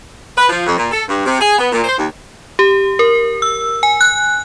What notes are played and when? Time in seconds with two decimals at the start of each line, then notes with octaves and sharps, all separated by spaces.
0.38 B4
0.49 F3
0.66 F2
0.78 A#2
0.91 A4
1.08 G2
1.26 C3
1.41 G#4
1.58 B3
1.72 A#2
1.84 C5
1.98 D#2
2.59 G4
2.99 A#4
3.42 E6
3.83 G#5
4.01 F#6